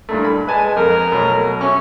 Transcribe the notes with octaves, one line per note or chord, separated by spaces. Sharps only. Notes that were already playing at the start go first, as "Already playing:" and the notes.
G2 A#2 A3
B5
G#3 B4 G#5 A5
F2 A#4
B2 F#3 A3
C#4 F#4 E5 C#6